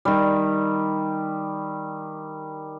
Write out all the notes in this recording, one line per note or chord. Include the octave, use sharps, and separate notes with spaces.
D#3 G3